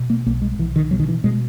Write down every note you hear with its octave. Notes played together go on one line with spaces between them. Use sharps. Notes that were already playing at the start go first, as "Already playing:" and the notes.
Already playing: B2
A#3
B1 A#3
G#3
B1 E3
D#3
B2 F#3
D#3
E3
B2 G#3